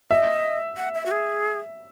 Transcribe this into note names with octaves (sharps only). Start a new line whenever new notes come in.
D#5 E5
F#5
E5
F#4
G#4